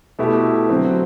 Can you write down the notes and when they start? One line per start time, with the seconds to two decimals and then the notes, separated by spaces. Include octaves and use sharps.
0.19 B2 A3 E4 G4
0.69 D3 F#3 C4